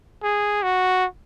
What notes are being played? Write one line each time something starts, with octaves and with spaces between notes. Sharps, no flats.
G#4
F#4